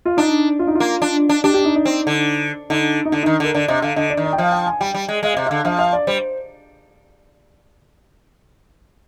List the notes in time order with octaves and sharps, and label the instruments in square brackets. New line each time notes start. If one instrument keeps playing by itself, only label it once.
[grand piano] F4
[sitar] D4 [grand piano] D#4
[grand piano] F4
D#4
F4
[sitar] A#3
D4
D4
[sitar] D4 [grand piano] G4
[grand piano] G4
D#4
D#4
[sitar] C4
D3
[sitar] D3 [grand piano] D#4
[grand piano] D#4
[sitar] D3 [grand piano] D4
[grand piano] D#4
[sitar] D#3
[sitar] D3 [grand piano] A#4
[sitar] D3 [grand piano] D5
[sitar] C3 [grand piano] D#5
[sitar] D3 [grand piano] F5
[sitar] D3 [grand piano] D#5
[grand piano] D5
[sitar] D#3
[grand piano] D5
G5
[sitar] F3 [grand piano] F5
[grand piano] G5
G#5
[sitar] G3 [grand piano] G5
[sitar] G3
G#3
[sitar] G#3 [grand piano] F5
[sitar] C3 [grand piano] D#5
[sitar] D3 [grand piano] F5
[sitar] F3 [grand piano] F5
[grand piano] F5
D5
[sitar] G3 [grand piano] C5